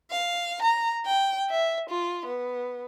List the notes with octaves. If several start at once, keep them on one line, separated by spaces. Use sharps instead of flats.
F5
A#5
G5
E5
F4
B3